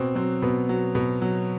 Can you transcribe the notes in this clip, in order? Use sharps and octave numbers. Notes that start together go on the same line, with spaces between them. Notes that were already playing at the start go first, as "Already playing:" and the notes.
Already playing: B2 C4
F#3 C4
B2 B3
F#3
B2
F#3